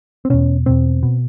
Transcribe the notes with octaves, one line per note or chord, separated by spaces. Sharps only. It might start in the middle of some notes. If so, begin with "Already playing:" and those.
C4
E2 B2 C#4
E2 B2 C4
B2